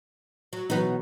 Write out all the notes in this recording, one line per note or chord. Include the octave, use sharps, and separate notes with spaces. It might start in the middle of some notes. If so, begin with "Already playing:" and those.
F#3
B2 E3 F#3 B3 D#4 F#4